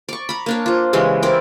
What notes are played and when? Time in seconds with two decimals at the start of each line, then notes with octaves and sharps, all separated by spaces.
0.09 D5 C#6
0.29 A#5 B5
0.46 A#3 D4 C#5
0.66 F4 C5
0.93 C#3 E3 G#3 G4
1.23 C4 E4 A#4 D5